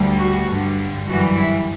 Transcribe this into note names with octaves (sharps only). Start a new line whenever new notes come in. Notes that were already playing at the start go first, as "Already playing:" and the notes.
Already playing: D2 D3 G3
F#4
G2 D3 G3
F#2 E3 G3 F#4
E4